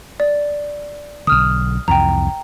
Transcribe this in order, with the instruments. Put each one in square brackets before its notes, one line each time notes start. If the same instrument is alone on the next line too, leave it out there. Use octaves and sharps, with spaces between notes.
[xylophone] D5
[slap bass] B1 D3 [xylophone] D#6 F6
[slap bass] C2 F2 E3 [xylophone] G5 A#5